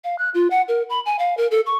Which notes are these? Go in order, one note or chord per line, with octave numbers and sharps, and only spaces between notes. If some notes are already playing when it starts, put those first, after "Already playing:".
F5
F#6
F4
F#5
A#4
B5
G#5
F5
A#4
A4
C#6